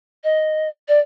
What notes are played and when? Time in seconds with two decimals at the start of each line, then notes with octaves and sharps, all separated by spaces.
0.24 D#5
0.88 D5